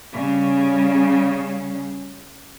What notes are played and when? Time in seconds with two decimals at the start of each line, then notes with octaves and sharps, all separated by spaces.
0.15 C#3 G3